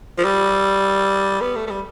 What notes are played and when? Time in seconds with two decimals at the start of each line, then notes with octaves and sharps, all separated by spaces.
0.18 F3
0.25 G3
1.41 B3
1.56 A3
1.66 A3
1.70 G3